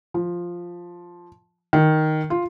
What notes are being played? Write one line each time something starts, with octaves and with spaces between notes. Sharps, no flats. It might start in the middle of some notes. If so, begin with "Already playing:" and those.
F3
D#3
F4